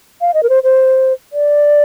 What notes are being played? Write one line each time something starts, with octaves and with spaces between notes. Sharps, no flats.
F5
D#5
A#4
C5
C5
D5